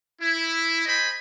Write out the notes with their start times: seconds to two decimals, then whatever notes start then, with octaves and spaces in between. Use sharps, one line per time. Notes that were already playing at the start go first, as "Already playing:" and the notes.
0.22 E4
0.86 C5 D#5 G#5 B5